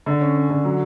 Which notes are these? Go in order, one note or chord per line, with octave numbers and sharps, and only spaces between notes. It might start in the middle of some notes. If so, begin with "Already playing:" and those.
D3
C#4
C#4
D3
F#3